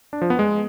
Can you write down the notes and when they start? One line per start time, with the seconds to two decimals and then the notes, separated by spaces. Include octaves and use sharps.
0.13 D4
0.22 F3
0.30 B3
0.39 G#3